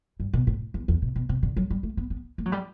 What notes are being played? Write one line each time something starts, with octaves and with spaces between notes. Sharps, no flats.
G2
B2
A2
E2
E2
B2
B2
C3
D3
F#3
G3
A3
B3
B3
A3
F#3
G3